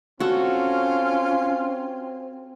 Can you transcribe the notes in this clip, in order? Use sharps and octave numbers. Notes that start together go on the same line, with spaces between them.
C4 C#4 F4 F#4 A4